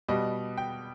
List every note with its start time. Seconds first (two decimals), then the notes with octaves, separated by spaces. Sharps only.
0.08 B2 G3 B3 D#5
0.57 G5